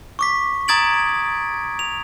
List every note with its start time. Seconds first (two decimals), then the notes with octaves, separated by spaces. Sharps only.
0.19 C#6 D6 B6
0.68 A#5 D#6 G#6 A6 D7 F#7
1.79 F7